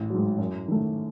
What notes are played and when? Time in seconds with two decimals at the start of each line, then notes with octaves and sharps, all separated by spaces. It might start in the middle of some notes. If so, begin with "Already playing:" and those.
Already playing: A1
0.10 G#2 F#3
0.38 F#2
0.68 D#3 A3